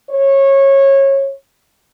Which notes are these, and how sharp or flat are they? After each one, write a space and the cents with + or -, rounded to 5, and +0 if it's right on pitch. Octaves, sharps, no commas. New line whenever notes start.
C#5 -20